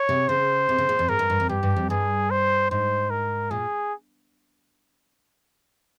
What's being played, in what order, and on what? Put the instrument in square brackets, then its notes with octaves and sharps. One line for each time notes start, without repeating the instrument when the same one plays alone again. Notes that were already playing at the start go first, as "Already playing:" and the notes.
Already playing: [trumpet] C#5
[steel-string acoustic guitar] C3
[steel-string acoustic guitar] C#3 [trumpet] C5
[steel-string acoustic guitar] C3
C#3
A#2
F2
[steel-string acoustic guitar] G#2 [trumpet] A#4
[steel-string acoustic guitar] G2
G2
F2
[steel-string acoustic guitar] G2 [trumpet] G4
[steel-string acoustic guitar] G2
F2
[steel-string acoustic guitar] G2 [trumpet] G#4
[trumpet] C5
[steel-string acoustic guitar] G#2 [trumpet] C5
[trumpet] A#4
[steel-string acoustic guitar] A#2 [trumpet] G#4